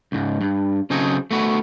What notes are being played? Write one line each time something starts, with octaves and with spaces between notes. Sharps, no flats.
C#2 G#2
G2
C#3 F#3 C4 D#4 G#4 A4
A3 B3 F#4